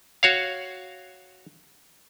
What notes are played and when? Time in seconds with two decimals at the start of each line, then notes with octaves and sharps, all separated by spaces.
0.23 F#4 C#5 F5